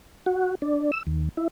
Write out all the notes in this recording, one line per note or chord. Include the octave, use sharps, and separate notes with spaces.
F#4
D4
E6
D#2
E4